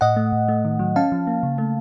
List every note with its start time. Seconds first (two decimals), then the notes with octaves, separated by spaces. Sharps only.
0.01 A2 D#5 F#5
0.16 A3
0.32 A2
0.48 A3
0.65 D#3
0.79 F#3
0.96 C#4 F5 A5
1.12 F3
1.27 A#3
1.43 C#3
1.58 A3